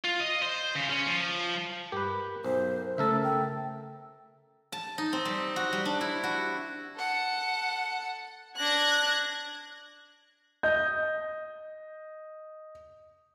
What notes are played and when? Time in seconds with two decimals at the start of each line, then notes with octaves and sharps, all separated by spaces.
0.04 F4
0.20 D#5
0.42 C5
0.75 C#3
0.89 C#4
1.06 F3
1.92 G2 G4 A#4 B4
2.44 B1 C5
2.98 C#3 A3 A4 A#4 E5 E6
3.24 G5
4.72 A5
4.98 D#4
5.13 C4
5.25 G3
5.56 F#4
5.73 G3
5.85 D4
6.01 E4
6.24 F#4
6.96 A4 F#5
8.59 D4 F#6 G#6 A#6
10.63 D#5 G6